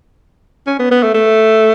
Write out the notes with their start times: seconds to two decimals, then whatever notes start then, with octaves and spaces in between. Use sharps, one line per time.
0.67 C#4
0.79 B3
0.91 B3
1.03 A3
1.14 A3